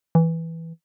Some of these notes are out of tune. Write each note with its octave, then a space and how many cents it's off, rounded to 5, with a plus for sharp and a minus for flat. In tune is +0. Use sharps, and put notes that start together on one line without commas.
E3 -5